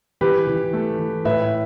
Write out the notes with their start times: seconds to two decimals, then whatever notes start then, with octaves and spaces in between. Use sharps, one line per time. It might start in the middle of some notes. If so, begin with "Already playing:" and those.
0.21 E3 G4 B4
0.47 E3
0.73 A3
0.99 E3
1.25 A2 B4 E5